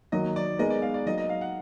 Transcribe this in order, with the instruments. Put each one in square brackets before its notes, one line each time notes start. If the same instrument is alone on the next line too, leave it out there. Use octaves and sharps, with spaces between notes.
[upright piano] D#3 F#3 A#3 [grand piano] D#5
[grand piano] D5
[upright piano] G#3 B3 D#4 A#4 [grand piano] D#5
[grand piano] D5
F5
D5
[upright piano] F#3 A#3 D#4 [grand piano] D#5
[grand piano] D#5
F5
F#5